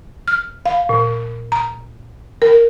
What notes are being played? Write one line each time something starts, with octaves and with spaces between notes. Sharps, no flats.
F6
F5
A#2
A#5
A#4